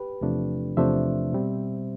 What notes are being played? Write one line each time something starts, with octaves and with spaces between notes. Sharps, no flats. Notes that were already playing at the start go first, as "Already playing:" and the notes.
Already playing: G4 B4
E2 C3 F3 A3 D4
E2 C3 F3 A3 D4 C5 E5
B2 G3 C4